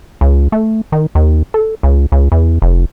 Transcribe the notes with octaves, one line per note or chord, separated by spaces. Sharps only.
C#2
A3
D#3
D#2
A4
C#2
C#2
E2
F1